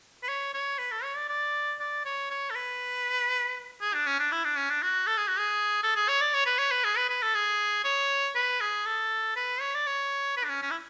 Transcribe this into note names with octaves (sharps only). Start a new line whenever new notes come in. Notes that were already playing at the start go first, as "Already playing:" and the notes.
B4
C#5
C#5
B4
A4
C#5
D5
D5
D5
C#5
C#5
A4
B4
G#4
D4
C#4
D4
E4
D4
C#4
D4
F#4
A4
G#4
F#4
G#4
A4
G#4
C#5
D5
C#5
B4
C#5
B4
G#4
B4
B4
A4
G#4
C#5
B4
G#4
A4
B4
C#5
D5
C#5
B4
D4
C#4
C#4
E4